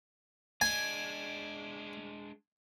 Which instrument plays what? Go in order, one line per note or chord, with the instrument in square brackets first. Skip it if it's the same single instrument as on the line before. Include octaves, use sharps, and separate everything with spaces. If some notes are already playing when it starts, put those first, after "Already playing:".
[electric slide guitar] G#3 D4 [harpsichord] G#5